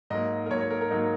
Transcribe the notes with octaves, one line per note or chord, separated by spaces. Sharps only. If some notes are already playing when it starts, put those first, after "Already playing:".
G#2 F#3 A#3 D#5
A#4
G#2 F#3 A#3 C#5
C#5
A#4
A#4
G#2 F#3 A#3 D#4